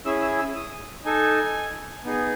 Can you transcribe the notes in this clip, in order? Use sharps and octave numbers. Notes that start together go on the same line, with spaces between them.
C#4 E4 G#4 E6
E6
E6
D#6
D#4 A4 G#5
B3 D#4 G#4